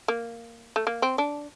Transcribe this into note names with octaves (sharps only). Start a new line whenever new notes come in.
A#3
A3
A#3
C4
D4